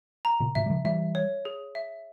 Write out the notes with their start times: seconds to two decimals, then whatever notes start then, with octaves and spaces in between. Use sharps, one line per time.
0.25 A#5
0.40 A#2 C#3
0.55 G#2 C3 E5
0.66 G3
0.70 C#3 F3
0.84 E3 G3 E5
1.15 C#5
1.45 G#4
1.75 E5